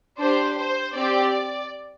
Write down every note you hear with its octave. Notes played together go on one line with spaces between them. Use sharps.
D4 G4 C5
C5
C4 G4 D5